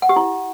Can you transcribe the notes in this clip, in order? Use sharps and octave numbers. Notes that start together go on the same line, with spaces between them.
F#5
G4
E4